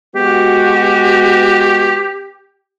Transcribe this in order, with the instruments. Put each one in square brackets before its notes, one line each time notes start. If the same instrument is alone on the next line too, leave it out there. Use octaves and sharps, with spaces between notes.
[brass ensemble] G#3 B3 F#4 [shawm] G4